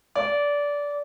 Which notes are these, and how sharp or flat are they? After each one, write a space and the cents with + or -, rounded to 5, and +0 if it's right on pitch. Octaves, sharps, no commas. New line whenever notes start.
D5 -20